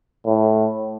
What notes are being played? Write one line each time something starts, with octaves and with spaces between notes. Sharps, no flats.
A2